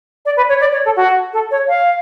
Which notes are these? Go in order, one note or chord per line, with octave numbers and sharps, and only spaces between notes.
D5
B4
C#5
D5
C#5
A4
F#4
A4
C#5
F5